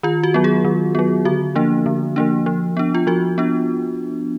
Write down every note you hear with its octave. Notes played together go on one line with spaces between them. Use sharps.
D#3 F4
F#4
F#3 B3
G#4
D#3
F#3 B3
D3 F#4
F3 A#3 D4
D3
F3 A#3 D4
F3
B3 D4
F4
F3 F#4
B3 D4